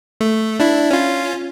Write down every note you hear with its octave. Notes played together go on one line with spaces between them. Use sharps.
A3
D4 E4
C#4 F4